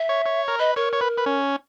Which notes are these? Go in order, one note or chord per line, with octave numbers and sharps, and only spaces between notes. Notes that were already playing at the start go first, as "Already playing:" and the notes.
Already playing: E5
C#5
C#5
A#4
B4 D#5
A#4 C#5
C#5
B4
B4
C#4